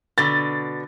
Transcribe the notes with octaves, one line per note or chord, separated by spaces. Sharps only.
B2 D3 A6